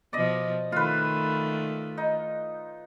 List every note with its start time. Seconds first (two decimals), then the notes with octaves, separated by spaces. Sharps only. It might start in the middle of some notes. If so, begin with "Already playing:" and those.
0.13 B2 F3 D5 D#5
0.72 D#3 A3 F4 B4
1.98 D#4